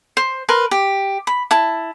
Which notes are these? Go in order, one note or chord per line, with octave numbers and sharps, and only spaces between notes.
C5
A#4 B4 C6
G4
B5
E4 A5